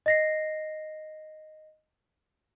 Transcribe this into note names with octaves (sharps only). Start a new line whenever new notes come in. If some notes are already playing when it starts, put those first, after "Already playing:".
D#5 A#6 C7